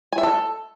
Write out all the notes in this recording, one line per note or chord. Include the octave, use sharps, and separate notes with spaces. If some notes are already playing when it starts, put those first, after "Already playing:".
G#5
E5
A4